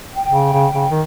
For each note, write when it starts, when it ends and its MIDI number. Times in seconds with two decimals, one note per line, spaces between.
0.13 0.90 79
0.30 0.52 49
0.53 0.67 49
0.74 0.85 49
0.90 1.02 51